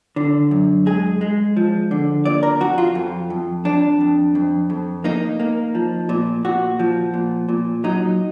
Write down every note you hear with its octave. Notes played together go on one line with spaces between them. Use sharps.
D3
F#2
G#3 G#4
G#3
F3
D3
A#3 D5
A#4
F2 F#4
F4
F2
F2
F2 D4
F2
F2
F2
A#3 D#4
A#3
F3
A#2
A#2 F#4
F3
A#2
A#2
F#3 D#4